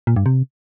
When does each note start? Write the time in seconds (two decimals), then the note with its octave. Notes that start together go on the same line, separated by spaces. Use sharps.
0.07 A#2
0.16 G2
0.26 C3